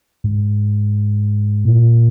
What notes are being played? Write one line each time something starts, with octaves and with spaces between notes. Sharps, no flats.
G#2
A#2